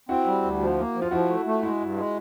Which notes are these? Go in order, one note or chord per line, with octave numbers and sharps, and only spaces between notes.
C4 E4 F#4
G3
D2
F3
A#3
F3
F4
F3 E4 F#4
A3
A3
G#3 E4 F#4
G2
G#3